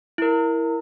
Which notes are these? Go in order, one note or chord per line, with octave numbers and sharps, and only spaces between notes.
E4 A#4